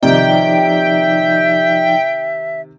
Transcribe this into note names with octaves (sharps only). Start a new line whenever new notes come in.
C3 D#3 F3 D#4 D5 E5 G5